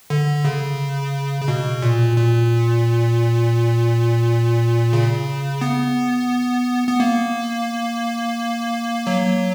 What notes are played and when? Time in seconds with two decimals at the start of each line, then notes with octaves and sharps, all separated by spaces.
0.10 D3
0.45 C#3
1.41 C#3
1.48 B2
1.82 A#2
2.17 A#2
4.93 C#3
5.61 B3
6.88 B3
7.00 A#3
9.07 F#3